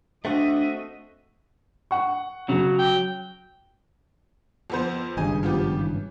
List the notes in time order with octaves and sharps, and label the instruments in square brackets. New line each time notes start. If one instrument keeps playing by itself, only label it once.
[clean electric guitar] A3 C4 F#4 [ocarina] D4 [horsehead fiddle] D#5 E5
[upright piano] F#5 C#6
[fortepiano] C#3 [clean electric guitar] F#3
[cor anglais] G5
[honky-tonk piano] F2 B3 C5
[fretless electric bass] G#1 G2 C#3 [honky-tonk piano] D#5 G#5
[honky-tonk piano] F3 B3 G4
E3